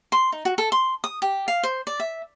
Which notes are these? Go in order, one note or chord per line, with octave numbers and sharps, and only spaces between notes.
C6
D#4
F#4
A4
C6
D#6
G4
F5
C5
D5
E5